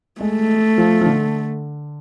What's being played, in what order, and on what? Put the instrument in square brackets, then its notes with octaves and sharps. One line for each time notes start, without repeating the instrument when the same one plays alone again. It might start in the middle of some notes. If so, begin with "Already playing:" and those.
[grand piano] G#3 [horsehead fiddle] A3
[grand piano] F3
F3
D3